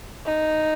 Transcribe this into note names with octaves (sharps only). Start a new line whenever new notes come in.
D#4